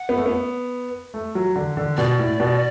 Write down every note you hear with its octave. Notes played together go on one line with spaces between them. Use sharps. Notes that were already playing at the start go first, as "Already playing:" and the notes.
Already playing: F#5
B3
A3
B3
A3
F#3
D3
D3
B2 D5
A2
B2